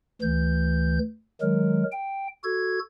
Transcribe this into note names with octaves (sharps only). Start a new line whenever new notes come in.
D2 E3 G6
D#3 F#3 G#3 A#4
G5
F#4 A4 G#6